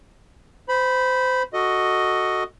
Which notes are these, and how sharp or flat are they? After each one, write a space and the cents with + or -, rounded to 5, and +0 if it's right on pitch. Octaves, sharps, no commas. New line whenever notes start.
C5 -25 B5 +0
F#4 +0 A4 +15 D#5 +0